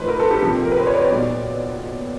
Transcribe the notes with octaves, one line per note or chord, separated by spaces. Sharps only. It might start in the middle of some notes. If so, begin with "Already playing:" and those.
Already playing: G#2 F3 A3 B4 C5
A#4
A4
G4
F2 C3 F3 A#3 C#4
A#4
B4
C5
C#5
D5
C#5
A#2 F#3 B3 D#4 D5